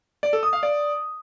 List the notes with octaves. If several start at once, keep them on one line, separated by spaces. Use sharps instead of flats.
D5
A4
D#6
F5
D5